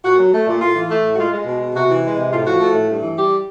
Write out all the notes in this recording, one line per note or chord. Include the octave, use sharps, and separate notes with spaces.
A#2 F#4
F#3
A3
A#2
A2 F4
E3
A3
A2
F#4
G#3 F4
G#3
B2
B2
C3 F#4
E3
G#3
C3
A2 F4
F3 F#4
A3
A2
G2
E3
G3 G4